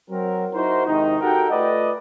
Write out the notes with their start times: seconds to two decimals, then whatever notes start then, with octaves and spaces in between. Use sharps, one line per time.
0.10 F#3 C4 A#4
0.53 D#4 E4 F#4 A#4 C5
0.87 G#2 C3 D#3 D#4
1.20 F#4 G4 A4 A#4 F#5 G5
1.50 A3 F4 B4 D5 D#5